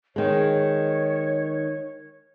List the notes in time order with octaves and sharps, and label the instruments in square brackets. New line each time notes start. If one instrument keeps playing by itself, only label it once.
[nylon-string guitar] D#3 G#3 [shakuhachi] C#5